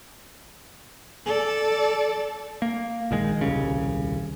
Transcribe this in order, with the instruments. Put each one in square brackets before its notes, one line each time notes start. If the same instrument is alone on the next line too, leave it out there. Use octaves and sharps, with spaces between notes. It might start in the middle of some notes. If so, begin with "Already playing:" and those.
[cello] A4 D5
[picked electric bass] A#3
A#1 D#3 G#3
D#1 C2 C#3